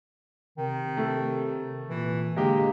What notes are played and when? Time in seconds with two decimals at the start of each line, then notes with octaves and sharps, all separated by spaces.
0.58 C3 D#3
0.97 A3
1.89 A#2 E3
2.36 D3 G#3 A#3 G4